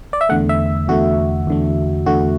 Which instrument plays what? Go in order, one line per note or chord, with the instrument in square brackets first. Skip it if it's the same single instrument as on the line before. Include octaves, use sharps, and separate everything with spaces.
[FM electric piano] D5
E5
E2 D3 A3 F#5
E5
E2 D3 A3 F#4
E2 D3 A3
E2 D3 A3 F#4